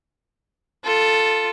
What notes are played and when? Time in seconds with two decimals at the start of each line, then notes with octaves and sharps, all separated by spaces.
0.84 F4 A4